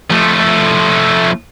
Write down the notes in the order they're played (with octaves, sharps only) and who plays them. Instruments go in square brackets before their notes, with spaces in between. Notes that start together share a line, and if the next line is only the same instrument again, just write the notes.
[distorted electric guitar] F3 A3